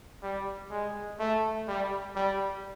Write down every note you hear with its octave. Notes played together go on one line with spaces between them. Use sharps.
G3
G#3
A3
G3
G3